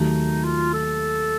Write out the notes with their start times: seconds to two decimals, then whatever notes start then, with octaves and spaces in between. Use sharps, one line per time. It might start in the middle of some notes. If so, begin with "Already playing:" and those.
Already playing: D#2 D#3 F#3 A3 D#4
0.45 F4
0.74 A4